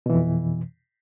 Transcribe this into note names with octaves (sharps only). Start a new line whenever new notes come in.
F2 B2 E3